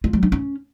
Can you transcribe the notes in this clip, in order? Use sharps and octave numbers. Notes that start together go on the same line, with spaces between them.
F4
F#3
D4
C#4